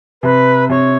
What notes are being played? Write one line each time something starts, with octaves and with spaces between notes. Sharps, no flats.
C3 B4
C3 C#5